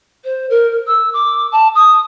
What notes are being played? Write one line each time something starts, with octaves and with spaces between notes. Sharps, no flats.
C5
A#4
E6
D6
A5
D#6